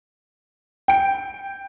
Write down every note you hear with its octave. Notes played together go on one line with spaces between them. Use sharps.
G5 D7